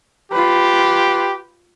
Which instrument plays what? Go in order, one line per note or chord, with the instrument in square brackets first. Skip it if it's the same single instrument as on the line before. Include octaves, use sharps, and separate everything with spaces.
[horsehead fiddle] F4 B4 [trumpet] G4